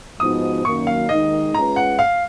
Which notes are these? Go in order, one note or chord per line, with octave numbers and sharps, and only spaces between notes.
G#2 F3 B3 D#4 F#4 D#6
F#2 D#3 A#3 C#6
F5
D#2 D#3 G#3 D#4 D#5
G#3 C#4 F4 B4 A#5
F#5
F5